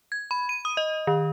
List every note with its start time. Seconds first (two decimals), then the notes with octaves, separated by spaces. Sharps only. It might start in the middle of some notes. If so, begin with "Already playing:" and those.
0.12 G#6
0.31 B5
0.49 D#7
0.65 D#6
0.77 D#5
1.07 D#3